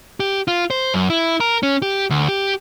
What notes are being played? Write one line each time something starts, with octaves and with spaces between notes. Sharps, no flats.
G4
F4
C5
F#2
E4
A#4
C#4
G4
D2
G4